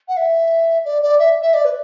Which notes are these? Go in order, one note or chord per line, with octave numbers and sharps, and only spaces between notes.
F#5
E5
D5
D5
E5
E5
D5
B4